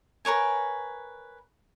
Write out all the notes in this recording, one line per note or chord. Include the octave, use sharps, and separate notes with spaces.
A#4 B4 C#5 G#5